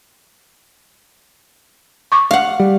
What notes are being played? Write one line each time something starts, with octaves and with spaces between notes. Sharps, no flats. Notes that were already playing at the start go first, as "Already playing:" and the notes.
C#6 D6
F5 F#5
G3